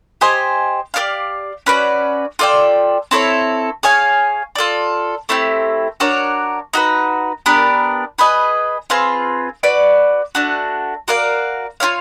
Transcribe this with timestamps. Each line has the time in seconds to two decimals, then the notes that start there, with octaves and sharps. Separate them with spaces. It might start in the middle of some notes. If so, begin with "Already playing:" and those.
0.21 G4 C5 D#5 G#5
0.94 G4 A#4 D5 F5
1.66 C#4 F#4 B4 D5
2.39 F4 A4 D5 G5
3.11 C4 E4 A4 C#5
3.83 G#4 C#5 F5 G#5
4.55 F4 A4 D5
5.29 A3 C4 E4 G4
6.00 D4 F#4 A#4 C#5
6.73 D#4 F#4 B4
7.46 B3 D4 G4 A#4
8.18 G#4 B4 D#5
8.90 C4 F4 G#4 B4
9.63 F#4 B4 D5
10.35 A3 D4 F#4
11.08 F#4 A#4 D5 F5
11.80 F4 A#4 C#5 F5